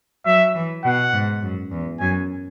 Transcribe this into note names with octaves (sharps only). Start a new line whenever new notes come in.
F#3 E5
E3
B2 F#5
G#2
F#2
E2
F#2 G#5